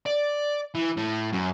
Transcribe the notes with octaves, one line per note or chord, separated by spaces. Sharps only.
D5
E3
A2
F#2